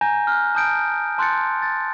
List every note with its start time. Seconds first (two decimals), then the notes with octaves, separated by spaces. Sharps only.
0.01 G#5 A#5 G6 A#6
0.27 F6 F#6
0.55 A5 D#6 G6 D7
1.18 A5 C6 F#6 G6 A6 C#7
1.62 A6